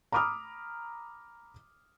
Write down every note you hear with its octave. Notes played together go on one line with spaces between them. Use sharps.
A#5 B5 D6 D#6 F6